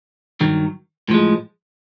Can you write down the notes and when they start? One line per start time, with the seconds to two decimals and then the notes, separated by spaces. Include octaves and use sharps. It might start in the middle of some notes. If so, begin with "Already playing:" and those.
0.40 G2 D#3 F#3
1.09 A2 F3 G#3